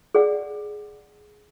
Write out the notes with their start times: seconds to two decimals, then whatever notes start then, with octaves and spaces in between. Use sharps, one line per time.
0.15 G#4 D5 F#5